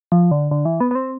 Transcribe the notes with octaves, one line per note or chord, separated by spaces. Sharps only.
F3
D3
D3
E3
B3
B3
C4